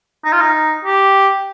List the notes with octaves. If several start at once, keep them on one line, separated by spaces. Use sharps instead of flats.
D#4
F4
D#4
G4